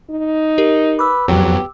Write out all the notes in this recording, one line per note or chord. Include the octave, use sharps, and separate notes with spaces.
D#4
G4 A#4
B4 D6 E6
F2 F#3 B3 G4